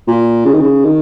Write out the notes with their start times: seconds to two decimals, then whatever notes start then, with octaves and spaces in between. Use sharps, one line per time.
0.07 A#2
0.45 C#3
0.53 D#3
0.61 C#3
0.84 D#3